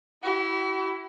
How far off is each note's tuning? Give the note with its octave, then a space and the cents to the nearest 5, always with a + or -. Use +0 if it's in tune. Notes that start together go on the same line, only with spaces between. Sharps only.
E4 +0 G4 -45